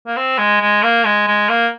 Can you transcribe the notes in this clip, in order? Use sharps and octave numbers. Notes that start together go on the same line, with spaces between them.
A#3
C4
G#3
G#3
A#3
G#3
G#3
A#3